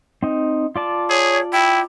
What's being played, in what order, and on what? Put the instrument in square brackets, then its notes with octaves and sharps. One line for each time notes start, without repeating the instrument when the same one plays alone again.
[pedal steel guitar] C4 D#4
F4 D5 A5
[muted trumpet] G#4 [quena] C#5
[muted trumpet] E4 [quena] G5